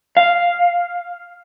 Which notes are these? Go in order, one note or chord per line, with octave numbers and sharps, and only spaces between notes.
F5